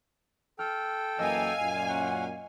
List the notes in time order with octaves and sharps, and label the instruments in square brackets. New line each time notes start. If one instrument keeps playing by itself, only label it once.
[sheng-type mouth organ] A4 G5 [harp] F6
[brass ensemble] F#2 E3 A#3 [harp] D#5 E6 [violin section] F5 G#5
[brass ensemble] F#2 A#2
[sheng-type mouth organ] C#4 F#5